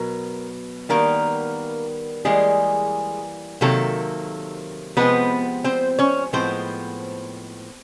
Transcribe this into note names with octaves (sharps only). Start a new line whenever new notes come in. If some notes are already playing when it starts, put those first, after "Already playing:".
Already playing: B2 F#3 A#4
D#3 G3 A#3 B3 A#4
E3 G3 G#3 A#3 G#4
C3 D#3 F#3 A#3 A4
C3 F3 G#3 B3 C4 B4
C4 C5
C#4 C#5
A2 F3 G#3 B3 C4 C5